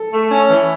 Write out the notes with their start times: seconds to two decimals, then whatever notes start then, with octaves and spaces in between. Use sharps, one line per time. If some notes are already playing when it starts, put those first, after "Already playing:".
Already playing: A4
0.12 A3
0.31 C#4
0.49 E3